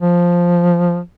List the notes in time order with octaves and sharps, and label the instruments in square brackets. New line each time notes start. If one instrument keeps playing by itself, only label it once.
[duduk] F3